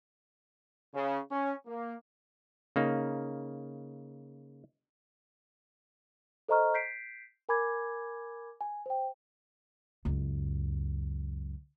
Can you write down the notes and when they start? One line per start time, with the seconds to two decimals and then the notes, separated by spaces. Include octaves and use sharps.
0.94 C#3
1.31 C#4
1.66 A#3
2.76 C#3 A#3 D#4
6.49 A4 C5 D#5 A#5 C#6 F6
6.74 G6 B6 C7 D7
7.49 A#4 G#5 B5 D6 G#6
8.61 G#5
8.86 C5 G5
10.05 C#2 F#2